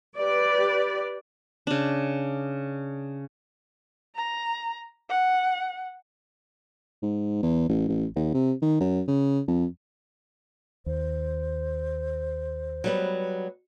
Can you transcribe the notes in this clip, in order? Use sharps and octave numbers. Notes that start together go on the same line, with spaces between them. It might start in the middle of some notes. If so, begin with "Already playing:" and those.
G4 B4 D5
C#3 D4
A#5
F#5
G#2
E2
A1
A1
D#2
C3
D#3
F#2
C#3
F2
D#2 C5
F#3 G3 B3